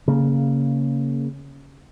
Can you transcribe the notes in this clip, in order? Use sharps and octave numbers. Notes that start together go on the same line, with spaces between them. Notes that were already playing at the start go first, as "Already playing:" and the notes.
C#3 A#3